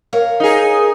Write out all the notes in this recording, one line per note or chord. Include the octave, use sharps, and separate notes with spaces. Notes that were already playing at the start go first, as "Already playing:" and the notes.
A#4 C#5 F5
D#4 G#4